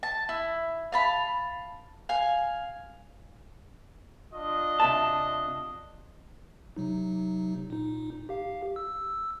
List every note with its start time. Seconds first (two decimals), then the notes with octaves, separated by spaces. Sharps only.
0.03 A5
0.29 E4
0.92 F5 A5 B5
2.09 F5 G#5
4.33 D4 F4 D#5
4.80 C3 E5 A5
6.76 C3 F#3 D#4
7.70 A#2 D#4
8.29 G4 F5
8.76 E6